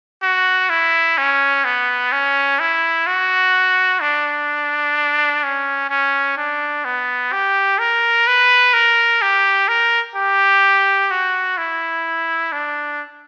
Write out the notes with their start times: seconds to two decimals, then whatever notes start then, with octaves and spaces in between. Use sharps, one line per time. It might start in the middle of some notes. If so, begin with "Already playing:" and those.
0.23 F#4
0.70 E4
1.18 C#4
1.65 B3
2.12 C#4
2.60 E4
3.07 F#4
4.01 D4
5.44 C#4
5.90 C#4
6.37 D4
6.85 B3
7.32 G4
7.79 A#4
8.27 B4
8.73 A#4
9.22 G4
9.68 A#4
10.16 G4
11.11 F#4
11.57 E4
12.52 D4